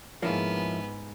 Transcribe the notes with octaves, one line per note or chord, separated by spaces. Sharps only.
G#2 F3 G#3 A#3 B3 C#4 E4 F4